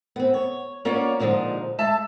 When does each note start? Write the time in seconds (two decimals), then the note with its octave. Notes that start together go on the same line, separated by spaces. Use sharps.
0.16 B3 C4
0.34 C#5
0.85 A#3 C#4 F4 F#4 C#5 D5
1.20 A#2 D3 F3 G#3 D#4
1.78 G#3 E5 A5